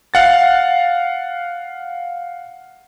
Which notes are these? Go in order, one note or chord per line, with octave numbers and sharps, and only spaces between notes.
F5 F#5 A6